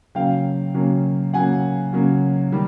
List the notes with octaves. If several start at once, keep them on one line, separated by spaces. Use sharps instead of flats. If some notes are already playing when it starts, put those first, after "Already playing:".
C#3 F#3 A#3 F5 G5
C#3 F#3 A#3
C#3 F#3 A#3 F#5 G#5
C#3 F#3 A#3
D#3 G3